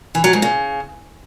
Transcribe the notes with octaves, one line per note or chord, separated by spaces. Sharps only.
E3
F#3
G#2
C#3